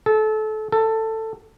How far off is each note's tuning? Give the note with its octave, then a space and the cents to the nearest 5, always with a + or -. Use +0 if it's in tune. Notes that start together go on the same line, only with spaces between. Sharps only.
A4 -25
A4 +15